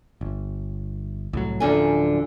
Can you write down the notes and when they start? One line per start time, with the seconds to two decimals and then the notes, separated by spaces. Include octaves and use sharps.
0.21 G1
1.33 C2 A2 F#3
1.60 D1 F#2 D3 F3 G#5